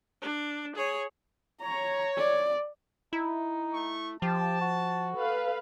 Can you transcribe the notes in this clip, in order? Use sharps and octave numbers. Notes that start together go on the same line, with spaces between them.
D4
G#4 C#5
C#5 A#5
D5
D#4 E4
A3 C#6
F3 G4 A5
F#4
A4 B4 F5